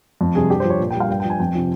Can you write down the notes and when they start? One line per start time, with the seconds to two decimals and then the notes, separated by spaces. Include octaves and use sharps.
0.21 F2
0.35 C3 G3 G#4
0.50 G2 G4
0.60 F3 C5
0.70 C#5
0.80 A#2
0.91 G3 G5
1.00 F5
1.09 G2 G5
1.20 F3 G5
1.30 G#5
1.40 F2 G5
1.55 C3 F3